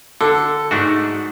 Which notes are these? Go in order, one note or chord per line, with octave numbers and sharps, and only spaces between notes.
D3 A4
G#2 A3 D4 F#4